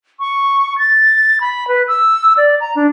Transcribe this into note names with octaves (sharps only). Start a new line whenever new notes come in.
C#6
A6
B5
B4
E6
D5
A#5
D4